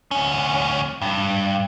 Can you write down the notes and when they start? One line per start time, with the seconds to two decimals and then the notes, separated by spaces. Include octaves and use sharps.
0.11 D2 C#4
1.02 G2